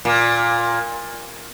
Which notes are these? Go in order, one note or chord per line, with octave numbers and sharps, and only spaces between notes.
A#2